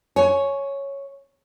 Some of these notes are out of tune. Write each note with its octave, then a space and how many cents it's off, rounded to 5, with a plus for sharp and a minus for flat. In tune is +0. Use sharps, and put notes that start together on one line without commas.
C#5 +0 G#5 +25